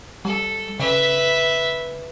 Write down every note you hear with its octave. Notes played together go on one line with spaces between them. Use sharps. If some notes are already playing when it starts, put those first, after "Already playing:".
G3 A4
C#3 B4 E5